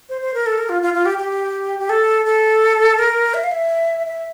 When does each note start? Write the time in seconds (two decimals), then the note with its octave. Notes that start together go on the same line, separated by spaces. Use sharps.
0.09 C5
0.22 C5
0.34 A#4
0.46 A4
0.58 A#4
0.69 F4
0.82 F4
0.94 F4
1.06 G4
1.18 G4
1.79 G4
1.90 A4
2.26 A4
2.99 A#4
3.34 E5
3.44 F5
3.51 E5
4.06 E5